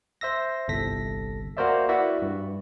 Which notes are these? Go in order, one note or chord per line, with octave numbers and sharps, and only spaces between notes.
C5 E5 E6 A#6
G1 C2 A4 A#6 B6
A#3 F#4 A#4 C5 D5 E5
E4 F#4 B4 D5 E5 F#5
G2